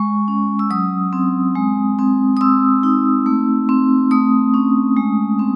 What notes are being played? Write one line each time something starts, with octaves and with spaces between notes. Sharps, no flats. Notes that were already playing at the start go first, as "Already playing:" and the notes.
Already playing: G#3 C#6
C#4
E6
F#3 D#6
C4
G#3
C4
D#6
C4 E6
D#4
A3
C4
A3 D#6
C#4
G#3
C4